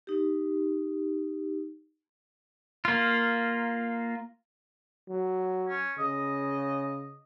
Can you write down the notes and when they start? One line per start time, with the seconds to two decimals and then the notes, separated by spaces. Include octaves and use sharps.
0.07 D#4 G4
2.85 A#3 F4
5.10 F#3
5.69 C#4
5.99 C#3 D#5